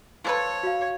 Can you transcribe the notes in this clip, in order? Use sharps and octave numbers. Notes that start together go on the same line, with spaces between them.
F3 A4 B4 C#5
F#4 F5